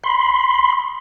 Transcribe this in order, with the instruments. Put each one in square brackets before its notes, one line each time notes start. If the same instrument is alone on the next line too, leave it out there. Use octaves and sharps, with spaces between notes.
[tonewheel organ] B5 C6